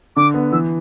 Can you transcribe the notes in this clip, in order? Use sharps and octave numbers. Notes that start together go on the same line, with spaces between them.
D3 D6
B3
E3 E6